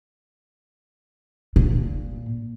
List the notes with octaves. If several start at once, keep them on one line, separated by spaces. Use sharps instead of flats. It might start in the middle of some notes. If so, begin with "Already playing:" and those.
A#2